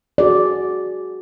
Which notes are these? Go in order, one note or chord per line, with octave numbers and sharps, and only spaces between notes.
F#4 G#4 D5